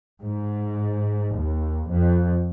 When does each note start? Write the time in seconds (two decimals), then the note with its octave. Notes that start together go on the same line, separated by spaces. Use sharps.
0.21 G#2
1.34 D#2
1.89 F2